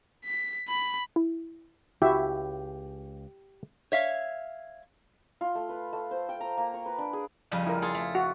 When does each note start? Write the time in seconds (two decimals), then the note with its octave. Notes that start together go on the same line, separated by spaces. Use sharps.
0.25 B6
0.68 B5
1.16 E4
2.02 C#2 E4 F#4 G4 E5
3.92 C#5 E5 F5
5.41 F4
5.55 A3
5.69 B4
5.93 A3
6.11 C5
6.29 G5
6.41 A#5
6.57 A#3
6.74 C#6
6.86 B4
6.98 D4
7.13 G#4
7.51 F2 C#3 G3
7.67 E4 A#4
7.82 F4 G#4 A4
7.95 A3
8.15 F#4